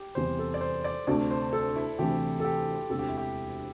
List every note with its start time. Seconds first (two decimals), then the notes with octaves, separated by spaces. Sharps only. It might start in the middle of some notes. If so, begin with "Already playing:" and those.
Already playing: G4
0.15 E2 C3 E3 G3 C5
0.39 A4
0.54 D5
0.61 C5
0.84 D5
1.07 D2 C3 A3 D5
1.31 C5
1.53 A4
1.76 E4
1.99 D2 C3 E3 A3 G4
2.40 A4
2.45 G4
2.90 E1 D2 C3 A4
2.99 G4
3.09 E4
3.18 G4